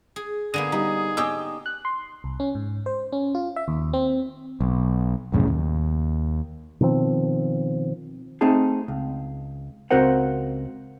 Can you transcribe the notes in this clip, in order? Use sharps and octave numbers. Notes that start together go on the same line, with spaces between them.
G#4
D3 A#3 B3 G#4 D#7
G3 B3 D#4
G4 C#5 D#5 G5 G#5 D6 E6
F#6
C6
C2
C#4
G#2
C5
C#4
F4
E5
D#2
C4
B1
C2 F#2 A2 C#3
D#2
B2 D#3 F3 C4
A3 C4 D#4 G#4 A5
C#2
C#2 C4 F#4 A#4 C5 F#5